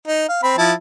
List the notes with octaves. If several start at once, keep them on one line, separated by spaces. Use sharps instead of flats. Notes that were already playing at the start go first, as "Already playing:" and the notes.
D#4
F5
C4 B5
F3 E4 A5